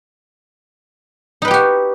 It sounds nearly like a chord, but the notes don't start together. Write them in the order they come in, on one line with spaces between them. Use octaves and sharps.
D#4 B4 G5 G4 F#4